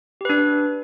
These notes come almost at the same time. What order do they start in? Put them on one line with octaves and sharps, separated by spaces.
G4 B4 D4